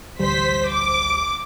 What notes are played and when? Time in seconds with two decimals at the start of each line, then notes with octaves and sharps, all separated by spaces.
0.19 A1 D2 G3 C5 B6
0.71 D6